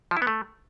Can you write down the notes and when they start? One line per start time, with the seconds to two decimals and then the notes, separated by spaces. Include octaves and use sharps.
0.11 F3
0.17 E4
0.22 B3
0.27 A3